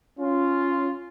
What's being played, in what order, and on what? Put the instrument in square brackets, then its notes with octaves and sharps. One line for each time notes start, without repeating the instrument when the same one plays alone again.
[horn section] C#4 F4